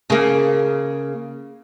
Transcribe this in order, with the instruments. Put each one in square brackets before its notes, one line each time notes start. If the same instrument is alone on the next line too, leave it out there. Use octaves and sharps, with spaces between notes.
[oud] C#3 A#3